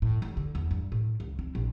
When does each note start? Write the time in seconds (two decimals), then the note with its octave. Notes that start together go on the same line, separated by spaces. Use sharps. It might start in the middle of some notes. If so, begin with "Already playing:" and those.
0.02 A2
0.22 F1
0.37 D3
0.55 E2
0.71 G2
0.92 A2
1.20 C#2
1.39 C4
1.55 A#1